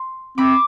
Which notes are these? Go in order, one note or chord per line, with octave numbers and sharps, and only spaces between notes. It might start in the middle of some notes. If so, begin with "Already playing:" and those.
Already playing: C6
C4 B5 D6